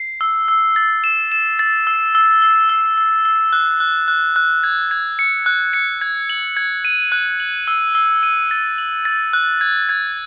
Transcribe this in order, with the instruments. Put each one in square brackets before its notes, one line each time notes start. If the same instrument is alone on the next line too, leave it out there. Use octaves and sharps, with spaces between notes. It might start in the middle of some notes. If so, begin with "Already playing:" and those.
Already playing: [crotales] C7
E6
E6
A6
E7
E7
A6
E6
E6
E6
E6
E6
E6
F#6
F#6
F#6
F#6
G#6
G#6
C#7
F#6
C#7
G#6
F#7
G#6
D#7
F#6
F#7
E6
E6
D#7
A6
F#7
A6
F#6
G#6
G#6